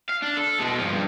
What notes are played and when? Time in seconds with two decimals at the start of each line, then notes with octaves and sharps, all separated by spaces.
0.09 F5
0.22 D4
0.37 A4
0.59 B2 G#3
0.79 G2 F3
0.93 G2